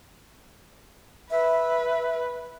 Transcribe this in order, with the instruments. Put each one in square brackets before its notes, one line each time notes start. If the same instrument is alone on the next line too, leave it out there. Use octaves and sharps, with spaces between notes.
[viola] B4 [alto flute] E5